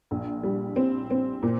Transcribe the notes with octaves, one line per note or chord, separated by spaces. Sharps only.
A#1
G3
C4
C4
A#2